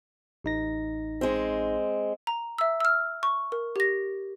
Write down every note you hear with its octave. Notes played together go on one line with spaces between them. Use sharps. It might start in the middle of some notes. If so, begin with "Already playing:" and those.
A1 D#4 A#6
G#3 C4
A#5
E5 E6
E6 F6
C#6
A#4
G4 A#6